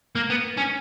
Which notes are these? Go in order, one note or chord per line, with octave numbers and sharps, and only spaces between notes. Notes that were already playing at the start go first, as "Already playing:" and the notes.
A#3
B3
C#4